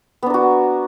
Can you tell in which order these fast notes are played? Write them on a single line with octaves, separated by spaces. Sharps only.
B3 D4 A#4 F#4